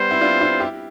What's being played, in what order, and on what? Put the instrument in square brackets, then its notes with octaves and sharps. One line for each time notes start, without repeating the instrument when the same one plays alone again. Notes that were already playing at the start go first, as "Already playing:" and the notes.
Already playing: [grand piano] G3 B3 [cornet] C5
[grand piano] C4 E4
D4 F4
D4 F4
E4 G4